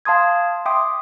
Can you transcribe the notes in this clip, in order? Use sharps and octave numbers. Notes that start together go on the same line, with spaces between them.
F5 A5 C6 D#6 G#6
E5 G5 C6 D6 D#6